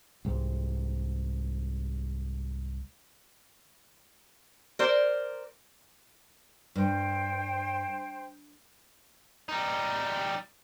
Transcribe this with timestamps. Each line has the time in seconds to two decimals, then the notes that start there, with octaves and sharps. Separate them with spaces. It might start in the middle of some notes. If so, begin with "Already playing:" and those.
0.25 C2 G#2
4.79 A#4 C5 D5
6.75 G2 C5 G5
9.49 G3 D#4